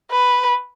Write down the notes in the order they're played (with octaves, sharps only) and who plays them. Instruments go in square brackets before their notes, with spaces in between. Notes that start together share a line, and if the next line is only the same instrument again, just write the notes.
[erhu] B4